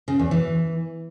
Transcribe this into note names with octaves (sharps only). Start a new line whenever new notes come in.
C#3
E2
E3